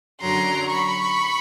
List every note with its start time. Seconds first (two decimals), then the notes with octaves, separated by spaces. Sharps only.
0.21 F#2 D3 F#3 A#5 C6
0.70 B5 C#6